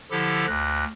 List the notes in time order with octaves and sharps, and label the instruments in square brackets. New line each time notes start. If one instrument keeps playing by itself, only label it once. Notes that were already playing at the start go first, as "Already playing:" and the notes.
[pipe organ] D3 F3 E4 G4 A4
D2 F#6 A#6